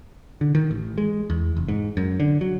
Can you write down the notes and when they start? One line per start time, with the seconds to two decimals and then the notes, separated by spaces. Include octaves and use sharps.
0.41 D3
0.55 D#3
0.71 A1
0.98 G#3
1.30 E2
1.57 F1
1.68 G#2
1.97 F#2
2.20 D3
2.41 F#3